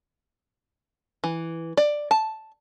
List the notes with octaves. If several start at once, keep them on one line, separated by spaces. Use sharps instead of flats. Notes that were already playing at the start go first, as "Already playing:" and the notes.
E3
D5
A5